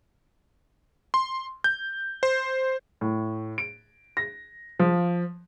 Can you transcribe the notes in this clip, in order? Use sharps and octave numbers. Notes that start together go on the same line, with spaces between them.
C6
G6
C5
A2
D7
A#6
F3